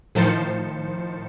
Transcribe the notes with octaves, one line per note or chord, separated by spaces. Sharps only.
A2 D#3 F3 C5 A5 C#7